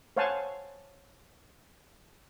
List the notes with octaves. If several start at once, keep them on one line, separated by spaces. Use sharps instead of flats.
C5 C#5 F5 F#5 G#5 A5